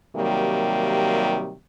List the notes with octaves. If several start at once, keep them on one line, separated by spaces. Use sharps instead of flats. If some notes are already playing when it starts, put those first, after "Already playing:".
C3 D#3 F#3 G3 A#3